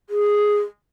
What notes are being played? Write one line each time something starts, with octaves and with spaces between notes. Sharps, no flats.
G#4